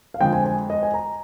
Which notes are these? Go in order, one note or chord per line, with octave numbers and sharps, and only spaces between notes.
F5
F2 D3 G#3 C4 G5
G#5
G#5
D#5
G#5
A#5